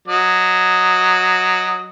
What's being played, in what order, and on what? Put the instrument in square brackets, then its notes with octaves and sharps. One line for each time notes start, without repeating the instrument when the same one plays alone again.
[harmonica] F#3 D#5